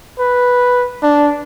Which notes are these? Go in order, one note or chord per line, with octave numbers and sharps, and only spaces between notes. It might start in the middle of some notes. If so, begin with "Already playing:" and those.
B4
D4